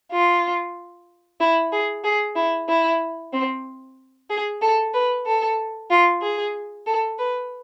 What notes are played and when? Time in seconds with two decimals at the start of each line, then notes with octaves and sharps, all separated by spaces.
0.11 F4
1.39 E4
1.72 G#4
2.04 G#4
2.36 E4
2.68 E4
3.32 C4
4.30 G#4
4.61 A4
4.93 B4
5.26 A4
5.90 F4
6.22 G#4
6.87 A4
7.19 B4